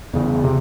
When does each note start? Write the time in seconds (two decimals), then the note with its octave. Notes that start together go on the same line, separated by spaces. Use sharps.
0.13 E2 C#3
0.44 C3